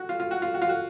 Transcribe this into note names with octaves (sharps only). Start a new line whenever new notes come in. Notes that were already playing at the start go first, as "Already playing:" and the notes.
Already playing: F#4
F4
F4
F#4
F4
F#4
F4
F#4